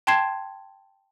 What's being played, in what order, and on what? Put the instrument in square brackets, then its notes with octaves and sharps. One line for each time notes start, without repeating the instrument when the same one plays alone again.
[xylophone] G5 A5 C6 G#6 C7 E7